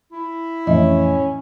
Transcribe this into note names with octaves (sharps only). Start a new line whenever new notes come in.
E4
F2 A2 E3 C#4 D#5 E5